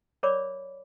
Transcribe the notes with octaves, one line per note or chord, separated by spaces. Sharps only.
A#4 C#5 D5 B5 D6